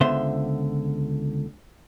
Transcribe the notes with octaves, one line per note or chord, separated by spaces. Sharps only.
C#2 D3 B3 C5 E5 C6